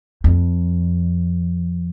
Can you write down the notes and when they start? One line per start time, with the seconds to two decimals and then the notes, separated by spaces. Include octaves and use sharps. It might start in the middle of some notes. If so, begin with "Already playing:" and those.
0.24 F2